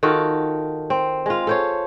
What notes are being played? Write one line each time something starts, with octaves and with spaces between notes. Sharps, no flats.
D#3 F4 F#4 A4
C4
G#3 F4
A4 C5 C#5